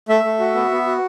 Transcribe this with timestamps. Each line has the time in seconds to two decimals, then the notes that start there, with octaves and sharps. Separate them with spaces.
0.09 A3 E5
0.24 A3
0.39 F#4
0.55 B3
0.71 B3
0.86 F#4